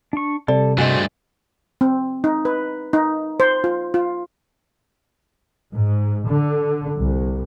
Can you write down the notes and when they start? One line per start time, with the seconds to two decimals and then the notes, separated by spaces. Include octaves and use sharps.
0.13 D4 C#6
0.48 C3 G3 A4 D5
0.78 G2 A3 F#4 G#4 C5 D#5 G#5
1.81 C4
2.24 D#4
2.45 B4
2.93 D#4
3.40 C5
3.64 F4
3.94 F4
5.74 G#2
6.30 D3
6.99 C2